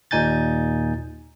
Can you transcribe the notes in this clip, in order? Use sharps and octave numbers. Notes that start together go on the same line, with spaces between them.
D#2 A#2 D#4 G#5 G6 A6